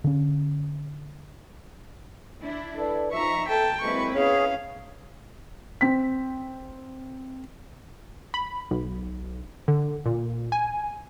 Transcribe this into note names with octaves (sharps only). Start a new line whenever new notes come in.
D3 C#4
D4 E4
A4 B4 D5
F3 D#4 E5 A#5 C#6
B2 A4 G5 A5
F#3 G#3 A#3 C4 E4 B4 C#6
B3 C#4 G#4 C#5 F5
C4 B6
B5
B1
D3
A#2
G#5